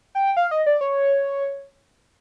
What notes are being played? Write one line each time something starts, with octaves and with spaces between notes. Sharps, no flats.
G5
F5
D#5
D5
C#5